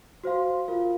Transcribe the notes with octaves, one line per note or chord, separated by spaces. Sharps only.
F#4 C5 F5 C6
F4 A#4 F5